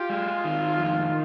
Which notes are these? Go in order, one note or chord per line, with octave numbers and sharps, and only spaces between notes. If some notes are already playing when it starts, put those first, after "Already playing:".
Already playing: F4 G4
G#3
D#3
F2